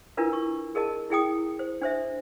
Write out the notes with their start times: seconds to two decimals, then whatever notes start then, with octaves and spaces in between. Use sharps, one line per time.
0.17 D4 E4 F4 A#4 B4
0.33 C#6
0.75 G#4 A#4 D#5 A5
1.10 E4 G#4 G5 D#6
1.59 C5
1.81 D4 C5 E5